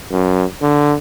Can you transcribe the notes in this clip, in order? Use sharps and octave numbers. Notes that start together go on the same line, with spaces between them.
F#2
D3